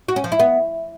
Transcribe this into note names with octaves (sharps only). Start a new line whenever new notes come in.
F#4
C#4
F3
E4
B3